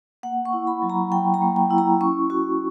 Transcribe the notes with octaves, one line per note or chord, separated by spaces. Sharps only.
A#3 F#5
C#6
E4
B5
F#3
A#5
F#3 G5
A#5
A#3
G5
E4
A#5
C#4 C#6
F#4 C#6